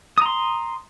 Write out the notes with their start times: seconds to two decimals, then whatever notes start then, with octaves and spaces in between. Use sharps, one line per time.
0.18 D#6
0.22 A#5
0.26 C6